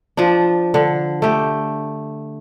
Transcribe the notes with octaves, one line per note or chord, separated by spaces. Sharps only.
F3 D4
D3
A3 G4